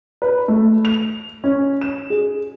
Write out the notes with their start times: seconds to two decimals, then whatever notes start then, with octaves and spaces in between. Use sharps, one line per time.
0.22 B4
0.48 A3
0.85 F7
1.44 C#4
1.81 E7
2.10 G#4